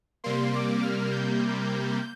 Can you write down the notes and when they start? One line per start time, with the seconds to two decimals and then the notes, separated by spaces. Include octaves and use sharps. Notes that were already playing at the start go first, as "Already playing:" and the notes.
0.24 C3 G3 A#3 C6
0.54 D6
0.83 F6
1.12 G6